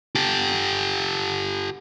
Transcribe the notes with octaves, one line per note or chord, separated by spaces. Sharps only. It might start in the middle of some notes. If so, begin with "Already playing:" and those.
G4 A4